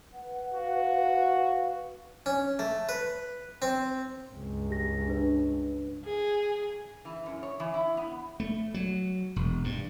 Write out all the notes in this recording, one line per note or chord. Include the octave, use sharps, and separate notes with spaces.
B4 F#5
F#4 F5
C#4
A3
B4
C4
C#2 G2
G4 A#6
D4 B4
G#4
E3
F#2
C#5
E3
E4
B3
A3
F#3
E1
G2